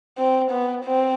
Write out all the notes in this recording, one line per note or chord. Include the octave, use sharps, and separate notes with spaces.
C4
B3
C4